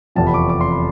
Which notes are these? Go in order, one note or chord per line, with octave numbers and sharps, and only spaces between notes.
F1 E2 C3 F3 A5
B5
D6
C#6
D6
C6
B5